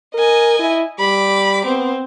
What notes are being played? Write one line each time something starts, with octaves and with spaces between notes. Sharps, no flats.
A#4 D#5 G#5
E4
G3 B5 D6
B3 C4